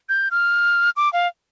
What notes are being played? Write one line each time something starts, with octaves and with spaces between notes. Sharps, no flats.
G6
F6
D6
F5